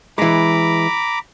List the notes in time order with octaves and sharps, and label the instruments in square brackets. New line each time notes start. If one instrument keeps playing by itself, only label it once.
[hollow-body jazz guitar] E3 G#3 [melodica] A#5 B5 D6